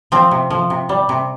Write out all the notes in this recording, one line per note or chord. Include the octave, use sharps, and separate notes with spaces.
F3 C4
C3
F3
C3
G3
C3